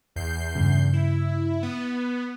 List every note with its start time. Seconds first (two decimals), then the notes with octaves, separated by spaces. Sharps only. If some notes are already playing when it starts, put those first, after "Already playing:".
0.16 E2 G6 C7
0.55 G2 C#3
0.93 E4
1.63 B3